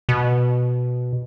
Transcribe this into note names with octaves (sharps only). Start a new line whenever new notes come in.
B2